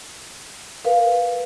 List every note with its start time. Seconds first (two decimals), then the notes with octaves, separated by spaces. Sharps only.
0.85 A#4 B4 F5